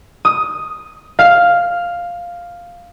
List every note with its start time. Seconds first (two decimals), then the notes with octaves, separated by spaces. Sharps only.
0.25 D#6
1.19 F5